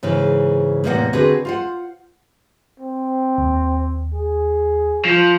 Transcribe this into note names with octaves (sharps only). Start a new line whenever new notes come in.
G#2 C#3 E3 G#3
E2 A2 C3 A#3 D5 F#5
D3 C4 F#4 G#4 B4
F4 C5 F#5
C4
D#2
G#4
F3